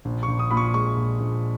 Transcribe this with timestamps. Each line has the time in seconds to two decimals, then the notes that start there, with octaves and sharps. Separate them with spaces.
0.05 A#1
0.23 C#6
0.28 A#1
0.39 D#6
0.51 A#2 B5
0.57 C#6
0.74 G#3 C#6
0.97 A#1
1.20 A#1